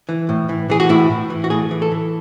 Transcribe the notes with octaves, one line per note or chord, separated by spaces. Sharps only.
E3
A2
E3
E3 G#4
F#4
A2 E4
A2
E3
F#4
A2 G#4
E3
A4
E3